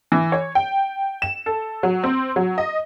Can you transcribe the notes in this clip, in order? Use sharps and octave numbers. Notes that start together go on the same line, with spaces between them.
E3
C#5
G5
E7
A4
F#3
C4
F#3
D#5